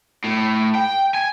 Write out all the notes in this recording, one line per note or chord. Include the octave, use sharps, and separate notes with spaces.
A2
G5
G#5